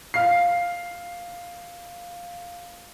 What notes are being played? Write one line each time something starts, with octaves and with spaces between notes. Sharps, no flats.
F5 C7